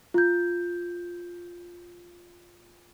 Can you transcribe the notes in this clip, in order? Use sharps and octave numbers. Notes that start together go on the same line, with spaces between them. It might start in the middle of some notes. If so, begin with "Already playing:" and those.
F4 G6